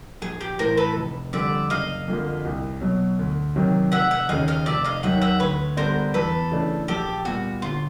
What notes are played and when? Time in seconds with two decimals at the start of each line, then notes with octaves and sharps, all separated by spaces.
0.22 A#1 G#4
0.41 G4
0.59 A2 E3 A#4 C5
0.77 A4 B4
0.96 F1
1.33 F2 D3 G3 D5 E5
1.70 F#1 D#5 F5
2.08 F2 D3 F3 A#3
2.45 C2
2.81 B2 F#3
3.19 D2
3.56 C3 D#3 F#3
3.92 F1 E5 F#5
4.11 E5 F#5
4.29 D#2 C#3 D#5 F5
4.48 D#5 F5
4.66 F1 D5 E5
4.84 D#5 F5
5.03 D#2 D#3 F#3 E5 F#5
5.22 E5 F#5
5.40 D2 B4 C#5
5.77 D3 G3 B3 D4 A#4 C5
6.14 E2 A4 B4
6.52 C#3 E3 A3 D4
6.88 A#1 G4 A4
7.25 A#2 G3 B3 F#4
7.62 G1 F4